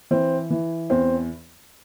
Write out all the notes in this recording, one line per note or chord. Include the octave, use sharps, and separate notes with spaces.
E3 C4
E3
E2 C4